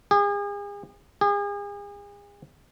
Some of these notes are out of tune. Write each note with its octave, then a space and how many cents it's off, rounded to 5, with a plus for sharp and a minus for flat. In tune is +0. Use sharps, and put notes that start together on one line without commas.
G#4 -40
G#4 -40